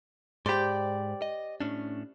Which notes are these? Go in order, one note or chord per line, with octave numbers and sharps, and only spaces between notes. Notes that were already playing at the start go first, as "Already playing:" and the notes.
G#2 G4 C5 D5 G5 B5 C6
D#5
A2 C#4 D4